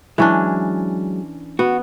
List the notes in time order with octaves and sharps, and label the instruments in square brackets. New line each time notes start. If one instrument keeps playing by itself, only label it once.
[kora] E3 C#4 D4 [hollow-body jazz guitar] F#3 G#3
[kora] B3 [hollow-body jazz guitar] F#4